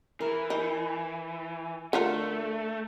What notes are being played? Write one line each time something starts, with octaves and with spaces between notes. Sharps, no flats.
E3 A#4
D#4
D3 A3 F4 A#4